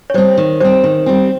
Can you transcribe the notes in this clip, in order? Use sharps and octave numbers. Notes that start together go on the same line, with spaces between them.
C#5
G3 C4 C5
D#3
G3 C4 C5
D#3
G3 C4